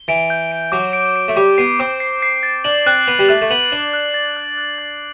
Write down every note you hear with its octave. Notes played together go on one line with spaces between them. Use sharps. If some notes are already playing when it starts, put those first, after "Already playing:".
Already playing: G7
E3 D7
G6
D7
F#3 D6
D7
D7
A3
G3 D6
B3 C7
C4 D6
C7
C7
A6
D4 F#7
C4 F#6
B3 F#6
G3
A3 F#6
A3
B3 F#7
D4 F#7
F#6
A6
F#6
F#6
A6